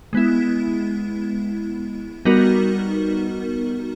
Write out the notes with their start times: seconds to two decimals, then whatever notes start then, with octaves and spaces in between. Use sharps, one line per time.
0.13 G#3 B3 E4
2.25 G3 B3 D#4 F#4 A#4